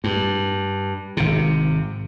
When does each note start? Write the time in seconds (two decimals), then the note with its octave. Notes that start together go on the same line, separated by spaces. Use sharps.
0.04 G2
1.17 G#1 C3